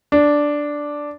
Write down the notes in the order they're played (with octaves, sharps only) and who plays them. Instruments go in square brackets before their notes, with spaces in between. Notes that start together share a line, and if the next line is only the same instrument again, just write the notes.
[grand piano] D4